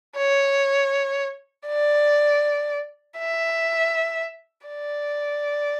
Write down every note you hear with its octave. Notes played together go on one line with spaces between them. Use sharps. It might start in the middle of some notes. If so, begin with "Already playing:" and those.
C#5
D5
E5
D5